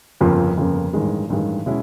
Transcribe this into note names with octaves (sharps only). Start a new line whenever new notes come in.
G1 F2 C#3 F3 A#3
G1 F2 C#3 F3 A#3
A1 G2 D#3 G#3
A1 G2 D#3 G#3
B2 G#3 C#4 E4